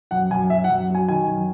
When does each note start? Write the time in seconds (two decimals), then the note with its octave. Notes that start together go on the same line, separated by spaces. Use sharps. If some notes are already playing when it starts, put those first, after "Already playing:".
0.11 F#2 F#5
0.31 F#2 G#5
0.50 F#2 E5
0.64 F#5
0.70 F#2
0.89 F#3
0.95 G#5
1.08 D#3 G#5
1.28 F#2